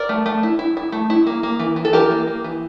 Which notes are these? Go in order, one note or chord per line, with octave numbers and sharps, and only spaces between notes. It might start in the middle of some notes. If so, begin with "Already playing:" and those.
Already playing: A#4 D5
A3
A3
E4
E4
E4
A3
E4
A#3
A#3
E3
E3
A4
E3 G4 A#4
A#3
A#3
E3